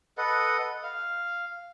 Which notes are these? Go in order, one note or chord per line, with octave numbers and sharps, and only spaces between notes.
A4 B4 D#5 F#5
F5